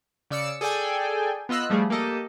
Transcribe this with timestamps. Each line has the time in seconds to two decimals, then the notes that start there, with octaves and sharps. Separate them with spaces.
0.31 C#3 D5 E6 C#7
0.61 G#4 A4 D5 G5 G#5
1.49 B3 F4 D#5 E6 F#6
1.70 F3 G3 A3 G#4
1.90 A#3 G4 A4 D#5